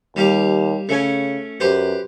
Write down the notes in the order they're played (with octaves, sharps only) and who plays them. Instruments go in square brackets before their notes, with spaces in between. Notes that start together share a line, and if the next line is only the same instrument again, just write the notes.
[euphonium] D#2 [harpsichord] G3 G4 F5
[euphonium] C#3 [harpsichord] A3 C#4 G#5
[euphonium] F#2 [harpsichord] G4 B4 C5